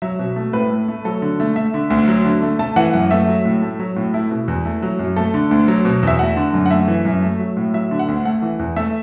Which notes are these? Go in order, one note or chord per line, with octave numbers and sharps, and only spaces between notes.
F#3 E5
B2
A3
A2 B4
A3
A3
F#3 A4
D3
A3
A3 E5
D3
D2
F#3
D3
A3
A3 A5
E3 F#5
F#2 F#5
A3 E5
F#3
A2
A3
F#3
A2
A3 E4
B2
E2
A3
F#3
F#2
A3 A4
D3
D2
F#3
B2
E2 E5
A3 F#5
D3
F#2
F#5
A3 E5
E3
F#2
A3
F#3
A2
F#3 E5
D3
F#5
D2
A3 F#5
E3
E2
A3 E5